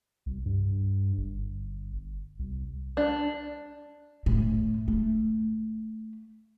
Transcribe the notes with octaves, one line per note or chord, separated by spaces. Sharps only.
C2
G2
G1
C2
D4
A2
A3